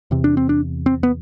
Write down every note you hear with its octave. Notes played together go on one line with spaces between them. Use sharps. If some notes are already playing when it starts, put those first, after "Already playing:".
E2 C3
D4
C4
D4
C4
B3